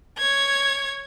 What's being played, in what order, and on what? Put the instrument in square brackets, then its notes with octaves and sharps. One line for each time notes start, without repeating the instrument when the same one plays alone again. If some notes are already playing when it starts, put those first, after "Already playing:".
[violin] C#5 G#6